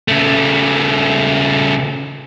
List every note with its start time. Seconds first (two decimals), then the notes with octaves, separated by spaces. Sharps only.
0.08 C#3 A3